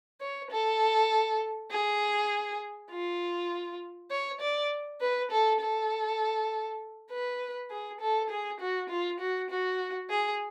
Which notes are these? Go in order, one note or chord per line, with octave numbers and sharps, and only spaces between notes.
C#5
A4
G#4
F4
C#5
D5
B4
A4
A4
B4
G#4
A4
G#4
F#4
F4
F#4
F#4
G#4